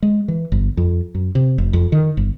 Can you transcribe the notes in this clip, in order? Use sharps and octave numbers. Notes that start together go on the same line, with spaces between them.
G#3
E3
G1
F2
F#2
C3
F1
F2
D#3
G1